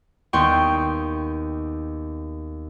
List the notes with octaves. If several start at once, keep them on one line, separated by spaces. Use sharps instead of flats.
D#2 B3 G5 C6 C#6